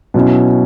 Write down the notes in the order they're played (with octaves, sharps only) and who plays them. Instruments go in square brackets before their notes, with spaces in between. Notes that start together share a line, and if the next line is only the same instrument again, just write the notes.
[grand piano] B2 F#3 C#4 E4